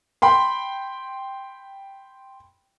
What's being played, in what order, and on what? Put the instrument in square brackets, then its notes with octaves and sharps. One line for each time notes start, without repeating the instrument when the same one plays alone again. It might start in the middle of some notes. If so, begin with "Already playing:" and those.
[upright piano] G5 B5 C6